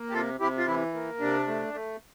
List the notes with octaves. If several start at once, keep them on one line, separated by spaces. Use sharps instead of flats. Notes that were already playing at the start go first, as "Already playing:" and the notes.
Already playing: A#3
G4
C3 F4 A4
C3 E4 G4
F4
E3 E4
A#3
C3 D4
A3
A3